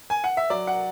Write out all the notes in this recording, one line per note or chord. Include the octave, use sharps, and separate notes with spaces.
G#5
F#5
E5
F#3 D5
F#5